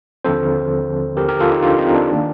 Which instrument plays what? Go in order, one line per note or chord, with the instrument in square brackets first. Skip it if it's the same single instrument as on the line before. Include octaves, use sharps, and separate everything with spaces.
[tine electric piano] D#2 D3 F3 C4 A4 C5
G4 A#4
G4 A#4
F4 A4
D#4 G4
D4 F4
C4 D#4
D4
D#3 A#3